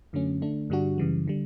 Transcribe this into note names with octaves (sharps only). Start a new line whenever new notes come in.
F#2 D3 F#3 A3 C#4
D3 A3 D4
G2 D3 G3 D4 F#4
F#2 C#3 E3 G3
D3 G3